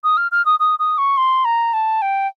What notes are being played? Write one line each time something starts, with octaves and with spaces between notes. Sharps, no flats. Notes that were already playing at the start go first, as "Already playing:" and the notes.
D#6
F6
F6
D#6
D#6
D#6
C#6
C6
A#5
A5
G5